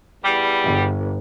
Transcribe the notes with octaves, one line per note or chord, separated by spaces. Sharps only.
E2 G3
G1